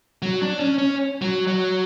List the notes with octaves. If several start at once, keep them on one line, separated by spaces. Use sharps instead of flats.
F#3
D4
C#4
C#4
F#3
F#3